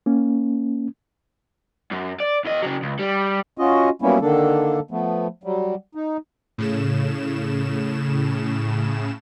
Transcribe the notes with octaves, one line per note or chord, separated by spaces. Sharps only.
A#3 C#4
F#2
D5
E2 D#5
C#3 F#3
C#2
G3
C#4 F4 F#4 D#5
F#3 G3 A#3 B3 C#4 E4
D3 D#3 A#3 D4 A4
F3 A3 B3
F#3 G3
D#4
A2 C#3 E7